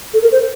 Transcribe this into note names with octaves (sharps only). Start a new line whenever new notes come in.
A4
A#4
C5